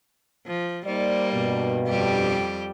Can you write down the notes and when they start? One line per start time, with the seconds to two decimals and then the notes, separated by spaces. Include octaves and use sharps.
0.47 F3
0.86 G3 A#3 D#4 C5 D5
1.34 G2 B2
1.87 F2 G3 G4